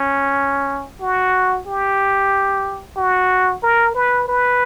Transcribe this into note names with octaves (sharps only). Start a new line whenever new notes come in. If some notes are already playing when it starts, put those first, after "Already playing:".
Already playing: C#4
F#4
G4
F#4
A#4
B4
B4